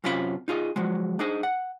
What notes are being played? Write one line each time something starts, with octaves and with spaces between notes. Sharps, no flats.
F#2 C3 C#4 F4 A#4 B5
D#4 F4 G#4 D#5
F3 F#3 G#3
D4 D#4 G#4 C5 D#5
F#5